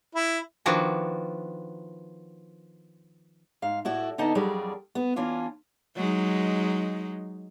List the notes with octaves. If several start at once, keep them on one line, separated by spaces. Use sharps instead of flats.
E4
D#3 F3 B3 D4 E4 F#4
G#2 F5
A2 E4 F#4 D5
D3 B3 D#4 D#5 A5
F2 F#3 G3 G#4 A#4 D5
B3
E3 C#4 D4 F4
F#3 G#3 D#4